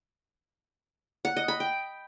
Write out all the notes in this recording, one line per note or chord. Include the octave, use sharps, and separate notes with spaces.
F#5
D#5
B5
G5